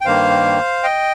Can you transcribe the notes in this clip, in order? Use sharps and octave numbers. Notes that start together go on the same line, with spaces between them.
G5
G2 D#3 A#3 C5 F5
D#5 G5